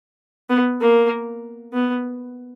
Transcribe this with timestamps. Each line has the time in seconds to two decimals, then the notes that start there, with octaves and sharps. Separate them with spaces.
0.49 B3
0.81 A#3
1.74 B3